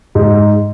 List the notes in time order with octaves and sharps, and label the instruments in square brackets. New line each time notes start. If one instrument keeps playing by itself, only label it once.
[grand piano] G#2